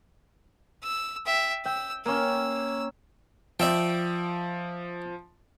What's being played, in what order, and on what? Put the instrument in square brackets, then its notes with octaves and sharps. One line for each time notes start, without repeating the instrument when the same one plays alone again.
[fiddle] E6
E5 G5
[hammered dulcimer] G5 [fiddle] E6
[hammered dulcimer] A#3 C#4 [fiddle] E6
[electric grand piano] F3 [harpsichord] D5 E5 G5